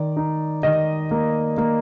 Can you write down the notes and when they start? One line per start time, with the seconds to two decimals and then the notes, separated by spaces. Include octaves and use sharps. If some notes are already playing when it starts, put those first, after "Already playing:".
Already playing: D#3 D5
0.17 D#4
0.63 D#3 D#5
1.11 A#3
1.58 A#3